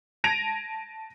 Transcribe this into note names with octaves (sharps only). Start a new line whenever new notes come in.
A5 G#6 A#6 D7 D#7 F7